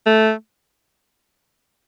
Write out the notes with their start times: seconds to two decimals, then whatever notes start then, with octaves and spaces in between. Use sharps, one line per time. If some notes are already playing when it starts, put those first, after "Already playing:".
0.06 A3